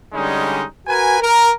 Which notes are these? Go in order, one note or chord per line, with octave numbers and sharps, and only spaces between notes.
D3 G3 G#3 C#4 D#4
F#4 A#4 B4 G#5
A#4